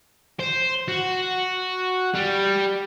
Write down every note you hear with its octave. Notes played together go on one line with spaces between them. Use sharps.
C5
F#4
G3